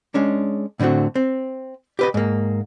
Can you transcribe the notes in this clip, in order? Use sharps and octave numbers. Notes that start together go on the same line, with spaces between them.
G#3 C#4 D4
A2 D3 A3 C4 F#4
C4
G4 B4 D#5
G#2 A#3